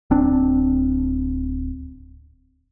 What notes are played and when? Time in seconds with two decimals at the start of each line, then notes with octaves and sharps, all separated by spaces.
0.10 D1 C4 D4